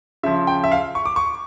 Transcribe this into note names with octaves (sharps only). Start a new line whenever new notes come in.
C#3 F3 E5
G5
E5
F5
C#6
D6
C#6